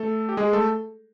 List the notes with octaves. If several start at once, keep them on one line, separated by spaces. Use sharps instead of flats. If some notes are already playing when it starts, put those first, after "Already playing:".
Already playing: A3 A4
G4
G#3 G#4
A3 A4